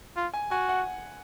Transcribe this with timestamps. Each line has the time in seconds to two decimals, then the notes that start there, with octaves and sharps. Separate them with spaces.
0.16 F4
0.34 G#5
0.51 F#4 G#5
0.69 F#5